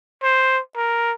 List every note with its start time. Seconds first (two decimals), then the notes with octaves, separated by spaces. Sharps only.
0.23 C5
0.76 A#4